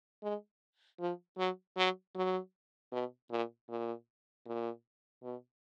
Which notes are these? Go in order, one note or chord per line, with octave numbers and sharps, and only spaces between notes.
G#3
F3
F#3
F#3
F#3
B2
A#2
A#2
A#2
B2